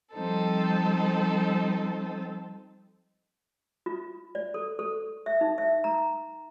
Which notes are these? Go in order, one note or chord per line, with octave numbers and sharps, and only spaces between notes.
F3 G3 C4 D#4 A4
F4
D5
A4
A4
E5
D#4
E5
A#5